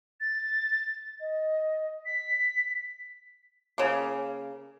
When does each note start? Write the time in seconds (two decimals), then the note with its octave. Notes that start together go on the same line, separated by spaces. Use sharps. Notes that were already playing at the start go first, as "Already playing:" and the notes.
0.21 A6
1.20 D#5
2.06 B6
3.78 C#3 A#3